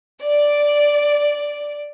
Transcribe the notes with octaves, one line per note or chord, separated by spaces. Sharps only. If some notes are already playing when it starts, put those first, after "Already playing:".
D5